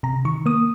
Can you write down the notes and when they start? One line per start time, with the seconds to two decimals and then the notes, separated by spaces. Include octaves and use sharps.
0.03 C3 A#5
0.25 D#3 C#6
0.46 A#3 D#6